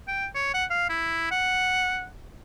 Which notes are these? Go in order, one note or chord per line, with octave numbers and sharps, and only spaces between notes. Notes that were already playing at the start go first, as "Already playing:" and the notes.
G5
C#5
F#5
F5
E4
F#5